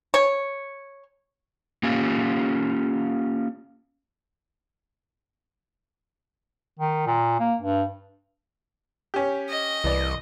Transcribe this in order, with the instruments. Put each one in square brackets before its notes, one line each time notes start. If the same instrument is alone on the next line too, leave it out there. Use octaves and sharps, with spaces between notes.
[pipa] C#5
[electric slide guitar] A#3 C#4 F4 G4 G#5
[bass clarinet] D#3
A#2
A#3
G2
[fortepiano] C#4 G4
[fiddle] D#5
[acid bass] C2 [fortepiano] E3 D5